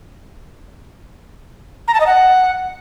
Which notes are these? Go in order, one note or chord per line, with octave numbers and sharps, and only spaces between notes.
A#5
A5
D#5
F#5